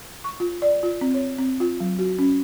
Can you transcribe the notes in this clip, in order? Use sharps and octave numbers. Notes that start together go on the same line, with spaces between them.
C#6
F4
D5
F4
C4
C#5
C4
F4
F#3
F#4
C#4